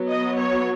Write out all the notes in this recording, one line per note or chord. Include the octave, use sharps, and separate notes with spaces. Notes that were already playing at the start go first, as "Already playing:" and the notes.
Already playing: F#3 B3
D#5
C#5